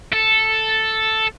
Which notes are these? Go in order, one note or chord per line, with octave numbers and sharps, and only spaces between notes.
A4